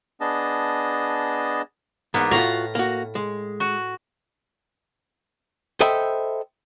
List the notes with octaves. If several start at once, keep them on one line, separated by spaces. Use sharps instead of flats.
B3 D4 G#4 D#5 A5
E2 G#2 A#3 B3
A2 F4 F#4 F5 A#5
A#3 F#4
G#3
F#4
A4 C5 D#5 E5 G5 B5